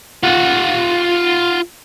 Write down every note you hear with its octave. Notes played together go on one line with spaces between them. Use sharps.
F4 F#5